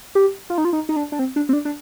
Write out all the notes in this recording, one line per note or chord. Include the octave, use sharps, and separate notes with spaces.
G4
F4
D#4
F4
D#4
D#4
D4
D4
C4
D4
C4
D4
D4